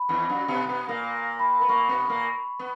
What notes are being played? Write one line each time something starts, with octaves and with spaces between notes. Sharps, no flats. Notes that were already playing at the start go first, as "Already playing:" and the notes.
Already playing: B5
E2 E3
F#2 F#3
B2 B3
B2 B3
A#2 A#3
B5
B3 B5
A#2 A#3 C#6
B2 B3
A#2 A#3
B3